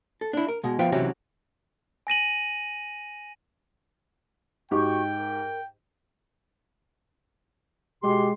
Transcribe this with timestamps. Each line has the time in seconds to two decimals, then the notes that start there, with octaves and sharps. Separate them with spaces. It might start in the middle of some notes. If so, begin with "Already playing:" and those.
0.21 A4
0.33 D4 E4
0.48 A#4
0.64 B2 G#3
0.79 F3 B3 F4 B4 E5 G5
0.92 C3 E3 F#3 C#4 F#4 G4
2.07 G#5 A#6 D#7 F#7
4.71 G#2 F#4 G4 G5 C#6
5.16 A#4
8.03 B2 G#3 G4 C6